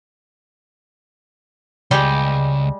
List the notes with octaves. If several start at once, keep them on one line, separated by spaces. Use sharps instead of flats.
C#2 G3 G#3